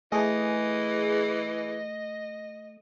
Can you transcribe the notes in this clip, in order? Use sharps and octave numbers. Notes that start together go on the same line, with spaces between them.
E3 A3 G#4 D#5